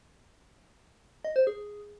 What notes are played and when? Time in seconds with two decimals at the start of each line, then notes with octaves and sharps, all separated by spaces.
1.25 D#5
1.36 C5
1.47 G#4